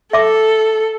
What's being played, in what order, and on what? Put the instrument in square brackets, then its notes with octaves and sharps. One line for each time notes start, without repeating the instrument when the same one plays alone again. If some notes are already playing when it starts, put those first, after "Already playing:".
[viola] A4 [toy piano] E5 D6